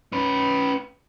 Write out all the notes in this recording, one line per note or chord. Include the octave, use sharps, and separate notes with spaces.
C#4 B4